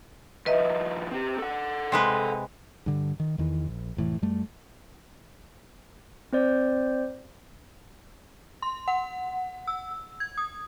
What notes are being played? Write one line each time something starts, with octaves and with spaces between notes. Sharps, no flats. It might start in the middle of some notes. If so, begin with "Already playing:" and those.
D#3 F3 B4 D#5 E5
C4 G4
A4 F#5
C3 G#3 B4 C6
G2 D3
D#3
E2 D#3 E3
A#1
F1 A2 E3
F#2 G3 A3
C4 C5 D5
C6
F#5
E6
G#6
D#6